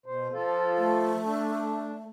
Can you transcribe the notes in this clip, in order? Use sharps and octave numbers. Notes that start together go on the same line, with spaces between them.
B2 C5
F3 F4 A4
A3
D4